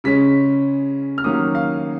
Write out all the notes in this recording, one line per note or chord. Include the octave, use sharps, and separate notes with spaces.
C#3 G#3 C#4 B6
F6
D#3 F#3 A#3 C#4 D#6
F5